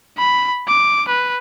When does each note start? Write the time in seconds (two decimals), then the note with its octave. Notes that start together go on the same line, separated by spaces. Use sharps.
0.18 B5
0.68 D6
1.08 B4